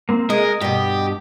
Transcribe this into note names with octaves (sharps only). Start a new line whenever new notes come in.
A#3 C4
G#3 A#4 D#5
G2 B2 G4